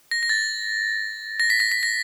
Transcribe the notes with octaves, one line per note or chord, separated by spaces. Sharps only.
A#6
A#6
A6
A#6
B6
A#6
B6
A#6